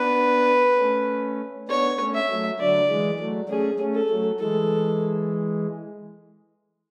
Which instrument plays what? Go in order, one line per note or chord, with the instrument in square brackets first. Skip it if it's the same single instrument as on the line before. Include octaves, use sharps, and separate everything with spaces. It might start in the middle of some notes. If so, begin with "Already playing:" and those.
Already playing: [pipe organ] B3 D4 [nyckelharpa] B4
[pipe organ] A3 C#4
[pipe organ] B3 D4 [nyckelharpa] C#5
[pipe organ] A3 C#4
[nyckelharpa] E5
[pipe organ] F#3 A3
[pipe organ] D3 F#3 [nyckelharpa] D5
[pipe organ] E3 G#3
F#3 A3
[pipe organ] A3 C#4 [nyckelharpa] G#4
[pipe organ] A3 C#4
[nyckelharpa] A4
[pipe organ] F#3 A3
[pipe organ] E3 G#3 [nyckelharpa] A4